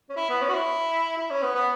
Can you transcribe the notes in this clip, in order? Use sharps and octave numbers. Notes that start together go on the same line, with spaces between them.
C#4
E4
B3
C#4
F#4
E4
E4
C#4
B3
B3